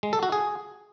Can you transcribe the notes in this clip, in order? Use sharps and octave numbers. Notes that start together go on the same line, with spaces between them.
G#3
A4
F#4
G#4